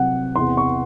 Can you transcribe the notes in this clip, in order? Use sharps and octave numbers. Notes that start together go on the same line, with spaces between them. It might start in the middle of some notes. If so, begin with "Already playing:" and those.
Already playing: C2 C3 F#3 F#5
E2 C3 E3 C6
C#6